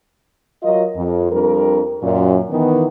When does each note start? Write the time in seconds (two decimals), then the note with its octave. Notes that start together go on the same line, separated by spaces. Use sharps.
0.63 F#3 F4 A#4 D#5
0.96 F2
1.32 F2 G3 D4 A#4
2.02 F#2 A#2
2.50 D#3 E3 B3